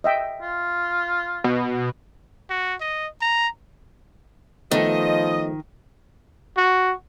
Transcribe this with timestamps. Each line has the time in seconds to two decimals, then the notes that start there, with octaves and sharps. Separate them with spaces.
0.04 D#5 E5 G5
0.42 F4
1.44 B2
2.50 F#4
2.81 D#5
3.21 A#5
4.71 D#3 F3 A3 B3 A4 D#5
6.57 F#4